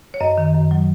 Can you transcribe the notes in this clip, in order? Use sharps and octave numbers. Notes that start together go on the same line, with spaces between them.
C#5
F#2 D#5
D#3
F#2
F#3